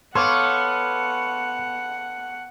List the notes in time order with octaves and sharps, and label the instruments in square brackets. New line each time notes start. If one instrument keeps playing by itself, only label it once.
[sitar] B3 [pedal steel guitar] A4 C#5 F5 [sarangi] F#5 [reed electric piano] C6 D6